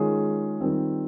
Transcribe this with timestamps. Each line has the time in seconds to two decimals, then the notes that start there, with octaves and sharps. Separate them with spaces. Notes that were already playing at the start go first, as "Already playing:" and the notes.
Already playing: D#3 G#3 C#4 F4 G#4
0.60 D#3 G3 C4 F4